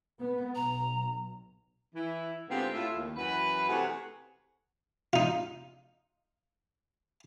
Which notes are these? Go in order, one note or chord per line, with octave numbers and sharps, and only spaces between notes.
B3
B1 A#5
E3 E4
G#2 D3 B3 C4 F4 G4
A2 F4 E5
D#2
F#2 E3 F#4 B4
C3 E3 A3 G#4 C#5 F#5
D#4 F4